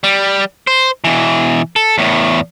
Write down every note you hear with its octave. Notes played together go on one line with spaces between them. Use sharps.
G3
C5
B2 E3
A4
E2 A2